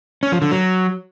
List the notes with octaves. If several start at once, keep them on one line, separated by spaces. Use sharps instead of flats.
C#4
F3
D3
F#3